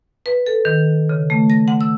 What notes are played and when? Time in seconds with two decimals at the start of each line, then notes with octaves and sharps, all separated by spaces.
0.26 B4
0.46 A4
0.65 D#3
1.09 C#3
1.30 A3
1.50 A#6
1.68 F#5
1.81 E6